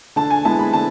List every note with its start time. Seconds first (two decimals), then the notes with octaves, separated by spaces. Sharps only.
0.16 D3 A5
0.30 G#5
0.45 G#3 B3 E4 A5
0.59 B5
0.73 D3 A5